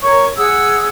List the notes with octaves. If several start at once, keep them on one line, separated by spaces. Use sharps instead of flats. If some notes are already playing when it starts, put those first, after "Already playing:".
A#4 C#5 C#6
G#4 F#5 D#6 E6